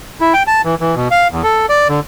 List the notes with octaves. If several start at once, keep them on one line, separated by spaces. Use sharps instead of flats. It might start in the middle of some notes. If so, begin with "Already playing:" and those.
E4
G5
A5
E3
E3
B2
F5
E2
A4
D5
D3